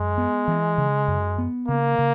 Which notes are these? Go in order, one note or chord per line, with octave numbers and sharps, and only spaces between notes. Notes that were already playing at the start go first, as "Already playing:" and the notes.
Already playing: F#2 G#3
B3
E3
C#3
F#2
B3
C#3 A#3
C#3